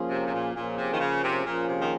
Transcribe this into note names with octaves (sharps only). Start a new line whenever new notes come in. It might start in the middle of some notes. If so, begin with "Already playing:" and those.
Already playing: F3 A#3 C#4 F4 G#4
C3
C3
A#2
A#2 F3 A#3 C#4 F4 G#4
C3
D#3
C#3
C3
A#2 F3 A#3 C#4 F4 G#4
C3
D#3